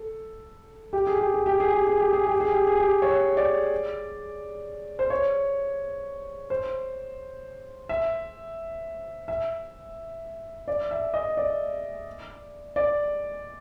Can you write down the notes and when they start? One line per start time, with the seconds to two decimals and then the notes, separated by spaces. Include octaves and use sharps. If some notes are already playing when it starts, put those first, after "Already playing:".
Already playing: A4
0.93 G4
1.07 G#4
1.19 G4
1.34 G#4
1.46 G4
1.60 G#4
1.73 G4
1.87 G#4
2.00 G4
2.13 G#4
2.27 G4
2.40 G#4
2.53 G4
2.67 G#4
2.80 G4
3.02 C#5
3.37 D5
4.99 C5
5.10 C#5
6.50 C5
7.89 E5
9.28 E5
10.68 D5
10.91 E5
11.14 D#5
11.37 D5
12.76 D5